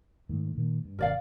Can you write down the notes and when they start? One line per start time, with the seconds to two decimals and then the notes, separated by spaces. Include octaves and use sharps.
0.29 G#2 D#3 A3
0.55 A#2 D#3 A#3
0.85 G2
0.99 G#1 C3 A#4 D5 F5